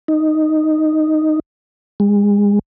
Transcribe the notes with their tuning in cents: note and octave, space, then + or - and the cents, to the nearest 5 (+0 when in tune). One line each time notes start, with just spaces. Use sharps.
D#4 -5
G#3 -30